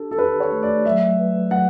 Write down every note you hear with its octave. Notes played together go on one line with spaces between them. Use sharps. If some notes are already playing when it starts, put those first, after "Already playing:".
Already playing: D4 G4 A4
A4
G4 B4
C#5
A3
D5
F#3 E5
B4
F#3 F#5